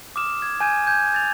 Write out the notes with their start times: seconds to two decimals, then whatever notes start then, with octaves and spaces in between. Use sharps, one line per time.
0.16 D6 D#6 F6 E7
0.42 G#6
0.60 G#5 G6 G#6 D#7
0.87 G6 G#6
1.13 G6 A6 F7